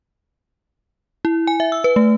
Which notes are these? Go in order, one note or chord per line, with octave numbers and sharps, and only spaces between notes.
E4
G#5
E5
E6
B4
A3